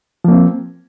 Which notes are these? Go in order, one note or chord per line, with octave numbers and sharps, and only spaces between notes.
F3 A#3 C4